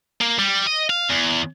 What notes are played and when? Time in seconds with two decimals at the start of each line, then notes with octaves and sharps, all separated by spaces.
0.21 A#3
0.39 G3
0.67 D#5
0.90 F5
1.10 E2